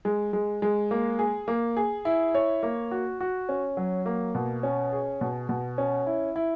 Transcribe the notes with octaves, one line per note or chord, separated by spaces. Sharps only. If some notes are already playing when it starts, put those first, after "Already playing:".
G#3
G#3
G#3
A#3
G#4
A#3
G#4
E4
C#5
A#3
F#4
F#4
C#4
F#3
A#3
B2
C#4
G#4
B2
B2
C#4
E4
E4